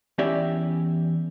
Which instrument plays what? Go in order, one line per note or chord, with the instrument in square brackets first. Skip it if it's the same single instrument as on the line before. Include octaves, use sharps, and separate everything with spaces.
[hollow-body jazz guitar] E2 C#4 E4 G4 D5 E5